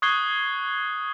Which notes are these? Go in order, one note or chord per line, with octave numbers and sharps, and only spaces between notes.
C#6 D#6 F#6 G#6 C7 G7